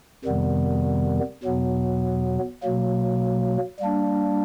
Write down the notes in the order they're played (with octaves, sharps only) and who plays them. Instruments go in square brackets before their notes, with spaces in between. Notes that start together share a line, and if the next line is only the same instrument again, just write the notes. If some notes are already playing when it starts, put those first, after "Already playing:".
[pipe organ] F2 C3 D#3 G3 B3
E2 B2 F#3 B3
B2 F#3 A#3
G3 A#3 D4